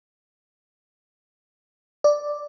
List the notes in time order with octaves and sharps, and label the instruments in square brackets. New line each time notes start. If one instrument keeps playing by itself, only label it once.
[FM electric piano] D5